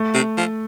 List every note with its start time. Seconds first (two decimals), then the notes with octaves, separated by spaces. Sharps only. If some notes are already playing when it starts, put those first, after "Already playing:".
Already playing: A3
0.14 C3
0.37 F3